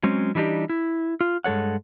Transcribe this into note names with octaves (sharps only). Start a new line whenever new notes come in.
F#3 G#3 C4 C#4
E3 G3 D4 D#4 G4
E4
F4
G2 G#3 A4 C#5 F#5